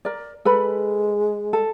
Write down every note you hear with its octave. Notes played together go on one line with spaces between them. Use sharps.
A#4 D5
G#3 A4 B4 B5
A4